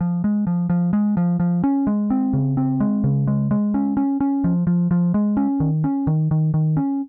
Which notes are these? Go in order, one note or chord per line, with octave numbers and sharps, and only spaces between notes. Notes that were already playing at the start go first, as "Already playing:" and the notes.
F3
G#3
F3
F3
G#3
F3
F3
C#4
G#3
C4
C#3
C4
G#3
C#3
G#3
G#3
C#4
C#4
C#4
F3
F3
F3
G#3
C#4
D#3
C#4
D#3
D#3
D#3
C#4